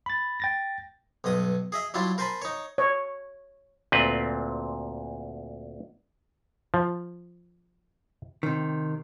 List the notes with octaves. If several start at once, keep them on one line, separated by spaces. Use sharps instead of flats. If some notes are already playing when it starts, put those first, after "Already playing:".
B5 A6
G5 A6 A#6
B1 G2 D#5 D#6
G#4 D#5 E5
F#3 G3 E4 F4 A5
A#4 C5 G#5 A5 B5
D#4 C#5
C#5
D2 A#2 C4 B4
F3
C3 D#3